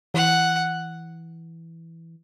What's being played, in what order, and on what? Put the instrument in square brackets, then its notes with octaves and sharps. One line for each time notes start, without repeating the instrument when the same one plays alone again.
[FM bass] E3 [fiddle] F#5